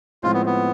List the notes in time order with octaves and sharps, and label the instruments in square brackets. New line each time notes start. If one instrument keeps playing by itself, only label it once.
[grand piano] A2 F3 G#3 C4 [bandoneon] F4
[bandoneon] B3
B3